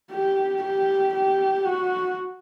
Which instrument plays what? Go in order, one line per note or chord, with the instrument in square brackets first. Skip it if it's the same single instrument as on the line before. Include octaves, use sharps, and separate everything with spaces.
[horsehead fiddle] G4
G4
G4
F#4